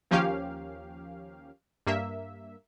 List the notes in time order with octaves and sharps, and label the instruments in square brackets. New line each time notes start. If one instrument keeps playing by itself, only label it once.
[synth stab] D#2 F3 A#3 C#4 G4 F5
G2 A#3 E5